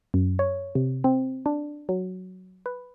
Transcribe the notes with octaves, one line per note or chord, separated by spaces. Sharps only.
F#2
C#5
C3
C4
D4
F#3
B4